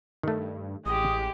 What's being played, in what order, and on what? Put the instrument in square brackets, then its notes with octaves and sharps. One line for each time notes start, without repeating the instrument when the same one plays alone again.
[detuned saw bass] G2 [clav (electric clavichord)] D#3 A3
[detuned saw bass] A1 [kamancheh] G#3 G4 [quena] D#6